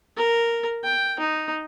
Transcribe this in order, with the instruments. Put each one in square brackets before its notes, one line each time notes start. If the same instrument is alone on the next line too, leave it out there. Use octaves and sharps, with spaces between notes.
[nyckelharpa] A#4
G5
D#4